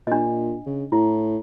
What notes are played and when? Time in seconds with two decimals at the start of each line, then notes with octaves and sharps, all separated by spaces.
0.07 A#2 D4 D#5
0.66 C#3
0.92 A2 E4